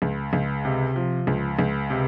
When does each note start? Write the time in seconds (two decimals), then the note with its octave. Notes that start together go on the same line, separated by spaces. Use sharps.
0.02 C#2
0.33 C#2
0.65 C3
0.96 F3
1.27 C#2
1.59 C#2
1.90 C3